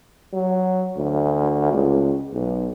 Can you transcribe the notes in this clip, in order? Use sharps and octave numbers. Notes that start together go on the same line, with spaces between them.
F#3
D2
C#2
B1